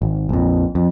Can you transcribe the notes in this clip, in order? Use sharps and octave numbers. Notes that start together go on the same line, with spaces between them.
G#1
A#1 F2
F2